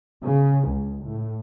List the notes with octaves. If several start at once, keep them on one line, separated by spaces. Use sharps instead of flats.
C#3
C#2
A2